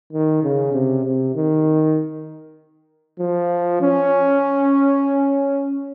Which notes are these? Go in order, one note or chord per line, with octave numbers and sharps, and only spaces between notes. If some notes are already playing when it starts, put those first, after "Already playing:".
D#3
C#3
C3
C3
D#3
F3
C#4